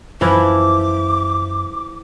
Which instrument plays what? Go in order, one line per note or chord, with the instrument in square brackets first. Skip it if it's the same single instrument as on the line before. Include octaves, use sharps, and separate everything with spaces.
[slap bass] F#2 [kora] E3 F3 E4 [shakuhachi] D6